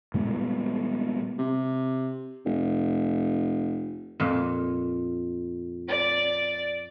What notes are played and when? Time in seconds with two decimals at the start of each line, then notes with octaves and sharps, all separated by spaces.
0.14 A#2 G3 G#3 B3
1.38 C3
2.45 F1
4.20 F2 A#2
5.89 D5